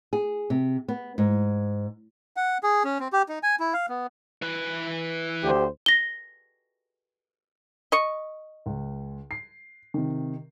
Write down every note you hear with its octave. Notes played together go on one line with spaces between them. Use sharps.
G#4
C3
B3
G#2
F#5
G#4
C#4
C4
G4
D#4
G#5
E4
F5
B3
E3 B4
D2 G4 C5
A#6 G7
D#5 C#6
C#2
C7
C3 D#3